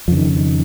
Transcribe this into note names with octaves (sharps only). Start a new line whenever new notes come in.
F2 C#3 F3
D#3
D#3